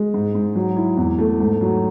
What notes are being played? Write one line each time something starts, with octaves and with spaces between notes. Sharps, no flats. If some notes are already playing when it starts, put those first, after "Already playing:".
Already playing: G#3
G#2
G#2
F#3
E4
E2
A3
G#2
F#3